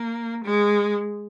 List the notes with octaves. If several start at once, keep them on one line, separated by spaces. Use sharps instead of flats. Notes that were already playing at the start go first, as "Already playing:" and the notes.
Already playing: A#3
G#3